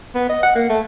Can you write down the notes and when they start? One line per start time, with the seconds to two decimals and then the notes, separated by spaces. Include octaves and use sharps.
0.15 B3
0.29 D#5
0.43 F#5
0.55 A#3
0.70 A3